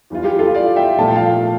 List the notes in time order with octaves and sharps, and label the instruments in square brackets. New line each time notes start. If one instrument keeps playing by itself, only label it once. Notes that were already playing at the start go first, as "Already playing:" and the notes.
[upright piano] E2 E3 G3 F4
G4
F4 A4
D5 F5
E5 G5
A#2 F3 A3 A5
G5
F5 A5